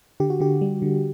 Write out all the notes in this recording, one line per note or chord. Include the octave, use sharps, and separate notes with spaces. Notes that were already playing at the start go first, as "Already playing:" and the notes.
D3 G4
F#4
D3 G4
G3
D3